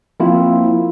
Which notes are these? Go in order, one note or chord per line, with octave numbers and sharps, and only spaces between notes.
F3 A#3 C4 E4 F4